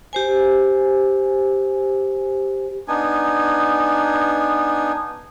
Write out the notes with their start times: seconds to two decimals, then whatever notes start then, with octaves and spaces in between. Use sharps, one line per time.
0.13 G4 C5 G#5
2.88 B3 D4 D#4 G#5